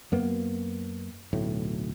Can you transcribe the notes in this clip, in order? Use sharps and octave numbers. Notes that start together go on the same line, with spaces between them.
F#2 A#3 B3
D1 B1 A2